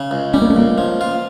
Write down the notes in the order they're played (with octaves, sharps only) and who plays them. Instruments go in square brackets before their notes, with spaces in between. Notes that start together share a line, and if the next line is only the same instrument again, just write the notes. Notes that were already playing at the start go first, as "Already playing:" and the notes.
Already playing: [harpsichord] C#3
C#2
[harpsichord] G3 [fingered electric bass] C#4
[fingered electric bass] A#3
A3
[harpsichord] C#2 [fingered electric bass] A#3
[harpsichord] F3
F4